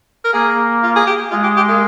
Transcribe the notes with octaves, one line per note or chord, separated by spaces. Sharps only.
A#4
A#3 G#4
F4
G#4
G4
G#3 F4
G4
G4
A#3